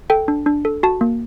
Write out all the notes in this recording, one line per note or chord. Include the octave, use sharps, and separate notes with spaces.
A4 G5
D4
D4
A4
F#4 A5
A#3